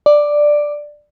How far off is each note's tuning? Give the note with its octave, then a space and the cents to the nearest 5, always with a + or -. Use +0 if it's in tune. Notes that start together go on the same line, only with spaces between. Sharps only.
D5 +5